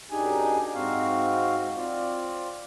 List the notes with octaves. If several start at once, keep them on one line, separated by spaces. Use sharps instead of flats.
F#2 D4 D#4 G4 G#4 G#5
G#2 C4 F#4 F5
C4 F4 D5